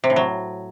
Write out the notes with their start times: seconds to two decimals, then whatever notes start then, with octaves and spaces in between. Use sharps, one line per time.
0.04 C3
0.10 A2
0.16 F#3